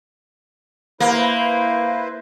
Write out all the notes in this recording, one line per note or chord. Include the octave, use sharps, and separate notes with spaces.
A#3 E4 B4 C5